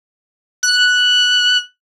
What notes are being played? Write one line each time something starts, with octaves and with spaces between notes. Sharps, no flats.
F#6